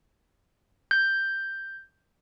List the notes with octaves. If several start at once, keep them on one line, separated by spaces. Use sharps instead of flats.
G6